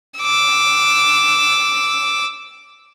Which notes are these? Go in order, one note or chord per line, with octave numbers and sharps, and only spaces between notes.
D6 E6